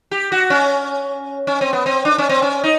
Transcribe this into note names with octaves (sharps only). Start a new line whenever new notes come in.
G4
F#4
C#4
C#4
C4
B3
C4
D4
C#4
C4
C#4
D#4